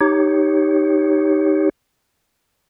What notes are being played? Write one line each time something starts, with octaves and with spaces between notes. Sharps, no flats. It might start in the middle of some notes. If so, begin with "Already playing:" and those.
D#4 G4 C#5